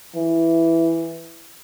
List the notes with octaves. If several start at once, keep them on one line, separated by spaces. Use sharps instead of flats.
E3